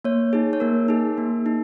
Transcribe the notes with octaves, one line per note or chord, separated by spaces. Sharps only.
A#3 C#5
D#4 G#4
C#5
A#3 A#4
D#4 G#4
A#3
D#4